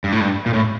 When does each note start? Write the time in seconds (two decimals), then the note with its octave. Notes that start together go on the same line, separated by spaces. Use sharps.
0.04 G2
0.12 A2
0.21 G2
0.46 A#2
0.53 A2